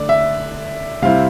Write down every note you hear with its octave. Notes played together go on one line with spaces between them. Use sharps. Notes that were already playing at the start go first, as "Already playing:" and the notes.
Already playing: D3 A3 D5
E5
C3 G3 C4 E4 F5